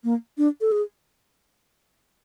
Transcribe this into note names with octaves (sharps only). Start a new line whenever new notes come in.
A#3
D4
A4
G#4